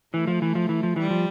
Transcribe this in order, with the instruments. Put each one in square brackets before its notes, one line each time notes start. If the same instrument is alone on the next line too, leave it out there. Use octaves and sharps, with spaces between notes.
[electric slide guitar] E3 [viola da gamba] A3
[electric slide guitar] F3
E3
F3
E3
F3
[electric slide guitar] E3 [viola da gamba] G3
[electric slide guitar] F3